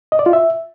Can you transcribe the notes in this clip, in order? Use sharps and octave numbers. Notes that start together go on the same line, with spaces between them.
D#5
D5
F4
E5